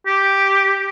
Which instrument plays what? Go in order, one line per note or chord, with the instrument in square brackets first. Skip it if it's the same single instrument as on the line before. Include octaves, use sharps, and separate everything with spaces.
[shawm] G4